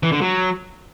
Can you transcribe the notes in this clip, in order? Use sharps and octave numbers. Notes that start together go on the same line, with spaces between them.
E3
D3
F#3